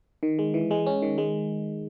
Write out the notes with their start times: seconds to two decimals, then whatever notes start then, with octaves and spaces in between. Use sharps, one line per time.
0.23 D#3
0.39 G#3
0.54 E3
0.71 G#3
0.86 C#4
1.02 D#3
1.18 G#3